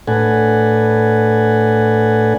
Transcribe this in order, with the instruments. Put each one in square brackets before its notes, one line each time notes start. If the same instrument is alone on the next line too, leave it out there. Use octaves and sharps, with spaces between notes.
[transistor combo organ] A2 D4 A4 B4 F#5 G#5